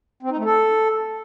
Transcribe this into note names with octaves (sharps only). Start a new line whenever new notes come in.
C4
D#4
A3
A4